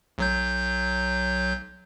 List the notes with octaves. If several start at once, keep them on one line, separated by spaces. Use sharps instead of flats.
B1 F#3 G6